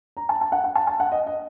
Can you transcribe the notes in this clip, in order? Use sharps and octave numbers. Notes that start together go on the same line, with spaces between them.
A#5
A5
A5
F#5
F#5
A5
A5
F#5
D#5
D#5